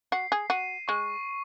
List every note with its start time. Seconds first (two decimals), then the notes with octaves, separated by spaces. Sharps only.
0.12 F#4 C7
0.32 G#4
0.50 F#4 D#7
0.88 G#3 C#6